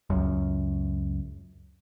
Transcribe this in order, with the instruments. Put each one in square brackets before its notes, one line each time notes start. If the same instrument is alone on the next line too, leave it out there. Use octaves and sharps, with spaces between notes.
[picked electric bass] C#2 F#2